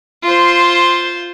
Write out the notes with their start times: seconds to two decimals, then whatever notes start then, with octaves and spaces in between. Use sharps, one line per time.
0.23 F4 C5